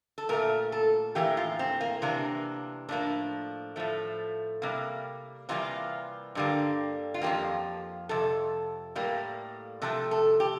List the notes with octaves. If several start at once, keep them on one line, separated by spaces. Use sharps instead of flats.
A4
A#2 A3 A#4
A4
A2 E3 A#3 G4
F4
C4
A#3
C3 E3 A#3 D4
A2 F3 A#3 D4
A2 F3 A3
C3 G3 A#3
C3 E3 G3 A#3 F4
G2 D3 G3 A#3
F4
F2 C3 F3 A#3 G4
F2 C3 A4
A2 G3 A#3
C3 F3 A3 A4
A4
G4